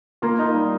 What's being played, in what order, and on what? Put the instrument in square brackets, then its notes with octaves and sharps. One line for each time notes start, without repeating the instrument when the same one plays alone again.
[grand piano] A#3 [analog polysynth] F4
[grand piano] D#4
[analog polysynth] G3